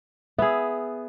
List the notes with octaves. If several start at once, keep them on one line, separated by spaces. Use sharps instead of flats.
B3 G#4 E5